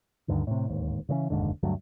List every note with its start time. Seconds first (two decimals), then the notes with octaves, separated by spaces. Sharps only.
0.28 D2 G2 D3 D#3
0.47 A2 C3
0.68 D1 D#2 G#2
1.09 C#3 E3 G#3 C#4
1.30 F1 D#2 G#2 D3
1.63 D2 G2 F#3 A3